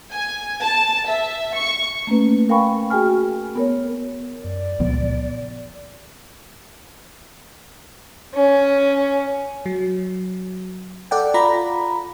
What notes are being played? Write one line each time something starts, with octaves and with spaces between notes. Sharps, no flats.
G#5
A5
E5
C#6
A3 A#3 C#4 B4
A#4 F5 G5 G#5 B5 C#6
F#4 G#4 G5 G#5 F6
B3 A#4 C#5
F#2 D5
C#2 A#2 F3 B3
C#4
F#3
A4 D5 F#5 G5
F4 D5 A#5 B5